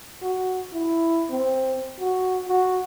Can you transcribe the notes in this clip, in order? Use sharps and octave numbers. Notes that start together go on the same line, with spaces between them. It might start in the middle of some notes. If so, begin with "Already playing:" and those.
F#4
E4
C4
F#4
F#4